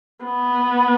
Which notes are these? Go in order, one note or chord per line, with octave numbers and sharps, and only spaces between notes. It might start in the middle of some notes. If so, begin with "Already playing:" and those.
B3